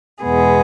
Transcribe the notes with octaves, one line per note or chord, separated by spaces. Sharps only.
E2 B2 G#3 B3 G#4